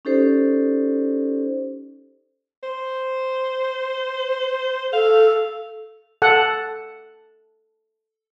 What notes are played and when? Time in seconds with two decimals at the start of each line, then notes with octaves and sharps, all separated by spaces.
0.05 C#4 D#4 G4 A4 C5 D5
2.63 C5
4.93 A4 F5
6.22 A4 F#5